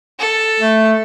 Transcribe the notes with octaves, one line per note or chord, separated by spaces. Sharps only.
A4
A3